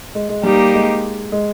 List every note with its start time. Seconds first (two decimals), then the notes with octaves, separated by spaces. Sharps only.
0.15 G#3
0.29 G#3
0.43 G3 A#3 D#4 G4
0.74 G#3
1.32 G#3